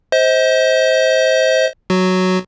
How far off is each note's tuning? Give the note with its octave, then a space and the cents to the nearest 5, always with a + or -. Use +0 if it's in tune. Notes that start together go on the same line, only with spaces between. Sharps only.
C5 +0 D#5 +40
F#3 +0 F#4 +0